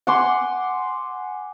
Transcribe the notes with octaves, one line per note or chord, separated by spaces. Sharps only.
F#5 G#5 C6 D6